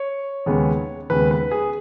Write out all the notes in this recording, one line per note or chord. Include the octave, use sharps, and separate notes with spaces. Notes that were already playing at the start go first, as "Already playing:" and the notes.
Already playing: C#5
D#2 C#3 G#3 B3
D#2 C#3 G#3 B3 B4
B4
G#4